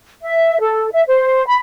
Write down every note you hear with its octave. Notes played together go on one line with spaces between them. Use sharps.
E5
A4
E5
C5
B5